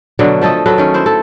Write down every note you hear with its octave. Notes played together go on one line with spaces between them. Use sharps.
B2 D3 F#3 A3
F3 A3 A4 D#5
F#3 A3 A4 B4
D#3 C#4
E4 C5
A4